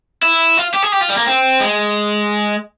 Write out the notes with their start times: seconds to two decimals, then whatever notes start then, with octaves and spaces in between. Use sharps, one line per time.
0.23 E4
0.57 F4
0.74 G4
0.83 G#4
0.92 G4
1.01 F4
1.10 G3
1.17 A#3
1.27 C4
1.60 G#3